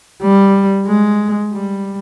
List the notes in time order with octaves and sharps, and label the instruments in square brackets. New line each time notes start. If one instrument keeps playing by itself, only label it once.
[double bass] G3
G#3
G3